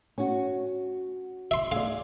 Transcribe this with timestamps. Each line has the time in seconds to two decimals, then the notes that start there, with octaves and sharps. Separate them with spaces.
0.18 C#4 F#4
1.51 E5 C6
1.72 G#4 D5 F5